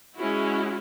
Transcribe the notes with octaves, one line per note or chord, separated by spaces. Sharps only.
G#3 C#4 E4 F#4